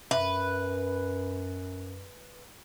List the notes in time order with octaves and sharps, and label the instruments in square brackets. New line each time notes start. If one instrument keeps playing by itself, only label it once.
[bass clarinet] F#2 [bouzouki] B4 [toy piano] E5